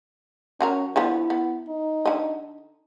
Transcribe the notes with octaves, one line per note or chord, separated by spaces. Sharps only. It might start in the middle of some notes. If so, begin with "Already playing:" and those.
F#3 C#4 F#4 A#4
D3 F3 B3 E4
B3
D#4
D3 D#5